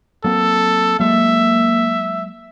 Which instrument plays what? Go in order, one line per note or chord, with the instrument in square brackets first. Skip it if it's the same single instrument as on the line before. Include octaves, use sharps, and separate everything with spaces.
[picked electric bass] F#3 A#3 C4 [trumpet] A4
[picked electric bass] F#3 G#3 [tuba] A#3 [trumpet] E5